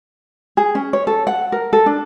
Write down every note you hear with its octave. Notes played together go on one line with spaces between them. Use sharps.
G#4
C#4
C#5
A4
F#5
A#4
A4
D4